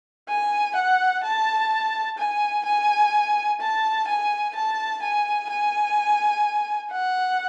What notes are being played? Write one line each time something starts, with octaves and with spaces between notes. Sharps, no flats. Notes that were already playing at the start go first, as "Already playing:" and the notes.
G#5
F#5
A5
G#5
G#5
A5
G#5
A5
G#5
G#5
F#5